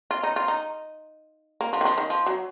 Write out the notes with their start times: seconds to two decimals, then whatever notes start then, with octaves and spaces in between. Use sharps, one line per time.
0.11 F4
0.23 D#4
0.36 F4
0.48 D#4
1.61 A#3
1.73 F3
1.81 D#3
1.85 F3
1.98 D#3
2.10 F3
2.26 F#3